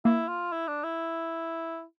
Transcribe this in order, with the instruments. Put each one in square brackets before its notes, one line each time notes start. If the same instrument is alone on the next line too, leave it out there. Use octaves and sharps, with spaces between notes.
[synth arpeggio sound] A#3 [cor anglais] E4
[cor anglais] F4
E4
D4
E4